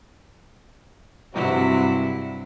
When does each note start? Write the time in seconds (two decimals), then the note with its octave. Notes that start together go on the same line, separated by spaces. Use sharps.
1.34 G2 C3 F#3 E4 F#4